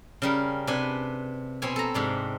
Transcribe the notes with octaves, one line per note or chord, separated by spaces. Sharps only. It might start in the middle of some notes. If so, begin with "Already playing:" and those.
C#3 G3 A#4
C3 D4 B4 G#5
B2 C4 C#5 G#5
A4 A#5
G#2 C3 D4